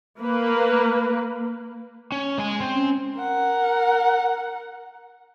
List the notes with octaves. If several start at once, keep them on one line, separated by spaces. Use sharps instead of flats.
A#3 B4
C#4
G#3 G#5
C4
C#4
A#4 F#5